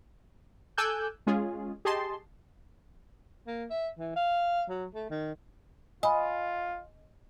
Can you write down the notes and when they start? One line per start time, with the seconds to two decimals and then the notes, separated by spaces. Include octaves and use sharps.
0.78 A4 G#5 D6 E6 F#6 G6
1.27 G#3 C#4 F4 G#4
1.85 G4 G#4 D#5 A5 C6
3.47 A#3
3.70 E5
3.99 E3
4.16 F5
4.69 F#3
4.94 A3
5.10 D#3
6.03 F4 D#5 G#5 B5